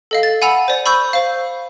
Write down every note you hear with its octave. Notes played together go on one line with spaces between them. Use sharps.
A4 D#5 F5
A6
F#5 G#5 B5 E6 F7
C5 D5
B5 C#6 E6 G6
C5 F5